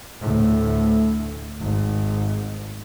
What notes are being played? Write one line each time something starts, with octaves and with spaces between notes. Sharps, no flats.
D2 A2
G#1